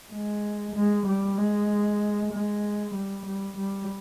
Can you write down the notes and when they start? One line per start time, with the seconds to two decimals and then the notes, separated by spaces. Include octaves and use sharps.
0.13 G#3
0.75 G#3
1.07 G3
1.38 G#3
2.32 G#3
2.95 G3
3.26 G3
3.57 G3